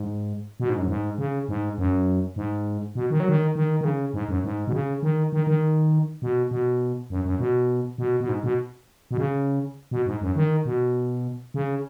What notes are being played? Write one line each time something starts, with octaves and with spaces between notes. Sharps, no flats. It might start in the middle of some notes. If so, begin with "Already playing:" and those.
Already playing: G#2
B2
G#2
F#2
G#2
C#3
G#2
F#2
G#2
B2
D#3
F#3
D#3
D#3
D#3
C#3
G#2
F#2
G#2
B2
C#3
D#3
D#3
D#3
B2
B2
F#2
F#2
B2
B2
B2
G#2
B2
B2
C#3
B2
G#2
F#2
D#3
B2
C#3